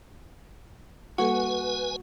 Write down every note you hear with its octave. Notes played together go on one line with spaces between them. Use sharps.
G3 A#3 F#4 A4 B4 G#5